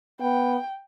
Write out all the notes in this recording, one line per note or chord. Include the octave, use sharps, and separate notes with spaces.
B3 G5